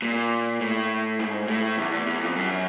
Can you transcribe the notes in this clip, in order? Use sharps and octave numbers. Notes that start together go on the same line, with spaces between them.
A#2
A2
G#2
A2
E2
E2
E2
F2
F#2